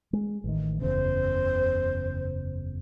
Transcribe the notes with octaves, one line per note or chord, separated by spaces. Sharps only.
G#3
A1 D#3
F#1 E2 C#3 C5